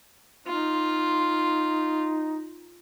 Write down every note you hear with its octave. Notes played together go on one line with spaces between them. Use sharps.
D#4 F4